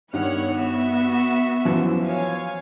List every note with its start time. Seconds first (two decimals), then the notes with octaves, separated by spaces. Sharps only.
0.13 G2 D#3 B3 C#5 F#5 F6
0.52 F#4 E5
1.65 F#2 E3 F3
2.04 C#5 F5 G#5